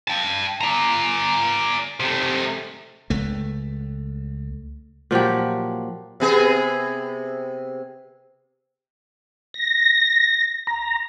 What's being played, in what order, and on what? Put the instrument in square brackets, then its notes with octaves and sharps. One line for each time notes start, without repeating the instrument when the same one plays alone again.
[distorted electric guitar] G5 A5
D5 A#5
C3 A3
[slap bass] C#2 A3
[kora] A#2 F3 F#3 G4
[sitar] C3 B3 G#4
[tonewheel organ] A#6
A#5